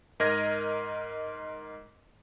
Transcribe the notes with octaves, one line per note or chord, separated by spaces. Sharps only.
G#2 A#4 D#5 G#6 A#6